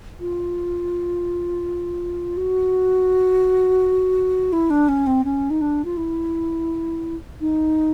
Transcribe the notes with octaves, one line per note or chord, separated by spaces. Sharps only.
F4
F#4
E4
D4
C#4
C4
C#4
D#4
D4
F4
E4
D#4